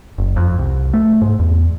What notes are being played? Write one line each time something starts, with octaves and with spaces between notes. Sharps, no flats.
F#1
F2
C2
A3
G#2
E2